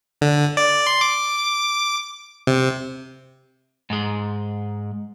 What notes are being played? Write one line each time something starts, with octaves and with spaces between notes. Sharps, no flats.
D3
D5
C6
D6
C3
G#2 G#3